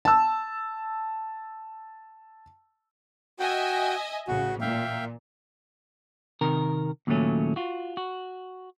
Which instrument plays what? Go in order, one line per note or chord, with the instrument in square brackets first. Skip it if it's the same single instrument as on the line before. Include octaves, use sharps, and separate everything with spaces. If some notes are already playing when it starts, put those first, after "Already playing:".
[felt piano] A5 E6
[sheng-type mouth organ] F#4 G5 [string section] D#5 E5 G#5
[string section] A1 C#3 [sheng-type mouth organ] F#4
[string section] A#2 [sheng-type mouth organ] E5 F5 G5
[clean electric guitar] C3 D#3 A#4
D#2 A#2 C#3 F#3 A3 C#4
F4 F#4
F#4